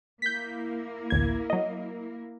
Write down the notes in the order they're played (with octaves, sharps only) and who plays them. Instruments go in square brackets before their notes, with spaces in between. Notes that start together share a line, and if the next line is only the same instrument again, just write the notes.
[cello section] A#3 E4 A#4 [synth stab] G6 B6
[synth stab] A1 D2 G#6
F#3 D#5